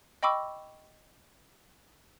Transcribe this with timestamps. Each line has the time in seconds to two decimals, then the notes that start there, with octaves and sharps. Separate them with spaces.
0.23 D#5 G5 B5 C#6 D6 E6